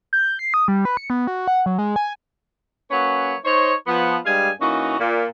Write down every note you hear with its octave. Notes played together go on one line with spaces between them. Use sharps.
G6
C7
D#6
G3
B4
C#7
B3
F#4
F#5
F#3
G#3
G#5
F#3 A#3 C#4 B4 C#5
D#4 C5 C#5
F3 B3
G2 G3 G#3 G#4 F5 G#5
E3 A#3 C#4 D#4 F#4
A#2